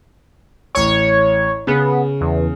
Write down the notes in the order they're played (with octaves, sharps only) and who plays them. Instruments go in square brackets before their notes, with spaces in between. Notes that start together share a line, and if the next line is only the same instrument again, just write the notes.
[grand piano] A1 C#6 [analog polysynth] C#5
[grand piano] C#3 [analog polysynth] B3
[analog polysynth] E2